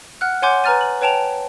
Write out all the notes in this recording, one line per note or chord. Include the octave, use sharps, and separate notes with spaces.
F#5 F6 F#6
C#5 F#5 G#5 C6 D6 G6
B4 G#5 A#5 F6 A6 D#7
F#7
B4 C#5 G5 A5 D7 F7